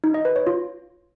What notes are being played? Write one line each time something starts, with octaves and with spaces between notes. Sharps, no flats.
D#4
D#5
B4
C#5
F4